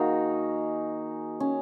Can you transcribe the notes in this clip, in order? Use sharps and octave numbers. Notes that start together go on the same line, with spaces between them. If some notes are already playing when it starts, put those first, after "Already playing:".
Already playing: D#3 A#3 D#4 F#4 G#4 A#4
C#4